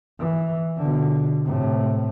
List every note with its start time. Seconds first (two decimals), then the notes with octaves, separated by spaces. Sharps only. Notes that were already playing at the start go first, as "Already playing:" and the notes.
0.20 E3
0.77 B2 D3
1.44 A2 C3